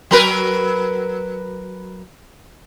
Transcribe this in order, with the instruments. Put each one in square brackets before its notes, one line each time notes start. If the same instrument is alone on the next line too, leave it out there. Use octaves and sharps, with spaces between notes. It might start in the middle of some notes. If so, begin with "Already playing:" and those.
[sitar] F#3 A#4 B4